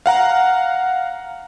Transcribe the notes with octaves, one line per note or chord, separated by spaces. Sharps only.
F5 F#5 A#5